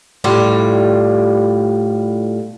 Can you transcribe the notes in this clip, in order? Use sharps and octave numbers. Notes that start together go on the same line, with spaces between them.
A2 G3 F4